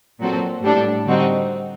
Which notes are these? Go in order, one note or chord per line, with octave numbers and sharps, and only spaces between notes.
A#2 F#3 C4 F#4 A4
A2 G3 D4 A4
D3 G3 C4 D#4 F#4